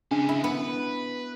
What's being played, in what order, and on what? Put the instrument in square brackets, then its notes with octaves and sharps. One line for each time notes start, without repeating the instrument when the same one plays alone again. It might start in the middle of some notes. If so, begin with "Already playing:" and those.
[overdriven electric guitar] C#3 G#3 [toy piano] D4
[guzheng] E4
[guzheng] B3 [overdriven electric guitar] B4